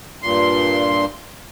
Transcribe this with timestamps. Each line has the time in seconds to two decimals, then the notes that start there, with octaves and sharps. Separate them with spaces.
0.22 G2 A#2 C6